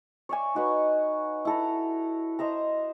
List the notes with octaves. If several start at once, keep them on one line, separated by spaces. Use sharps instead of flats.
C#5 D5 E5 G#5
D#4 F#4 B4
E4 A4 A#5
C5 D#5 E5 A#5